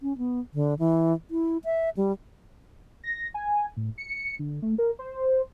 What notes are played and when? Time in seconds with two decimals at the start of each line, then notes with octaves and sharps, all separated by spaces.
0.01 C#4
0.18 B3
0.54 D3
0.79 E3
1.31 E4
1.65 E5
1.97 G3
3.04 A#6
3.34 G#5
3.77 A2
3.98 C#7
4.39 D3
4.62 A3
4.78 A#4
4.99 C5